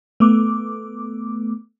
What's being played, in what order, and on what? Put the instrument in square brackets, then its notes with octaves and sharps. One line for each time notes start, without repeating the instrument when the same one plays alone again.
[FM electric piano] A3 B3 D6